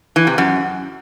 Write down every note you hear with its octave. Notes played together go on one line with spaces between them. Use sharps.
E3
C3
F#2